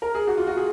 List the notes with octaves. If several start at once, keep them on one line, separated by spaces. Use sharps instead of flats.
A#4
G#4
F#4
F4
F#4
G#4